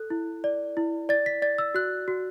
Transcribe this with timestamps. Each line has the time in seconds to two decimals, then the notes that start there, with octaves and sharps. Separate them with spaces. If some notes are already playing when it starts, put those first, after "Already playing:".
Already playing: A4 F#6
0.10 E4
0.44 D5
0.77 E4
1.09 D5 A6
1.26 B6
1.42 D5 A6
1.58 E6
1.74 F#4 F#6
2.08 F#4